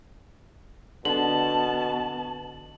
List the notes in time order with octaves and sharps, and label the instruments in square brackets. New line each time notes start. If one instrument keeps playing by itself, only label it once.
[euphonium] B2 [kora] D3 [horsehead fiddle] B3 A5 [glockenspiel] F#7